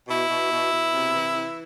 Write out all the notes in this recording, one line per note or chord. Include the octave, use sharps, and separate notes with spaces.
B2 E4
B2
B2
B2
C3
E3
E3